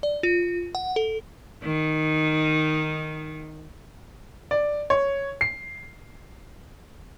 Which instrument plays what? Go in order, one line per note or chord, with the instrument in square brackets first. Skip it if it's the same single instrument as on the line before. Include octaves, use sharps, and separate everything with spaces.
[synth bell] D5
F4
F#5
A4
[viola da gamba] D#3 D#4
[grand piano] D5
C#5
C7